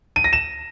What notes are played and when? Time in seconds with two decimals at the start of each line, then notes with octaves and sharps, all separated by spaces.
0.16 D#7
0.24 A#6
0.33 E7